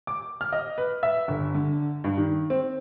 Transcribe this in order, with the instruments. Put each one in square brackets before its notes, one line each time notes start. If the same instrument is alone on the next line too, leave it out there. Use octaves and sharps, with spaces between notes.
[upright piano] D6
F6
D#5
B4
E5
G1
D3
G2
D#3
C4